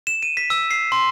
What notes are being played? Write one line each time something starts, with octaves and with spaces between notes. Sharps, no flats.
E7
D#7
B6
E6
C7
C6